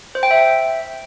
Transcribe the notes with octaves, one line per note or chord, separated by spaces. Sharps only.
C5
G5
E5